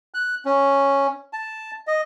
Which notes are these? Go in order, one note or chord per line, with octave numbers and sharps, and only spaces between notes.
F#6
C#4
A5
D#5